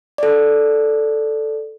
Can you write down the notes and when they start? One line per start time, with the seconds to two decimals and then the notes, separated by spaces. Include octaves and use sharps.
0.18 A4 D5